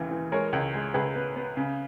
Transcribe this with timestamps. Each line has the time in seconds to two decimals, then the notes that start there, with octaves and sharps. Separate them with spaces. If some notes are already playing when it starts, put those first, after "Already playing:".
Already playing: D#2 C#3 E3
0.11 E3
0.32 G#3 A#4 C#5
0.53 C#2
0.74 G#3
0.94 C#2 G#4 B4
1.15 B3
1.36 B3
1.57 C#3